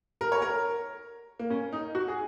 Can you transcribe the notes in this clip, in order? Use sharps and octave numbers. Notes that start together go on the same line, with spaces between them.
A#4
C#5
A#4
A#3
C#4
D#4
F#4
G#4